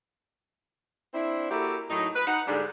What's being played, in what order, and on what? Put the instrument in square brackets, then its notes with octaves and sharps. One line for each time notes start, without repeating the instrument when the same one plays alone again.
[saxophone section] C4 D4 E4
A#3 E4 F#4 G4 A4
A2 F#3 D#4
B4
D#4 F#5
G#2 D3 G3 D4 G#4